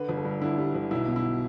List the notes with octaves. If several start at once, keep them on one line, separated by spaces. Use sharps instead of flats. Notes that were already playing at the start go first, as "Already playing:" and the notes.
Already playing: D3 B4
G1
A4
G2
D3 E4
G3
G1
B1 E4
B2
E4